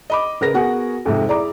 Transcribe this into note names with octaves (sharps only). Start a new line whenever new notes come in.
D#5 B5 D6
C#3 A#4 B4 A#6
B3 F#4 G#4 A#4 F#5 G#5
F2 G#2 C3
E4 G#4 D5 A#5 D6